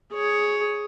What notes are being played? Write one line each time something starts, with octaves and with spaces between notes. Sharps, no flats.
G#4 C#5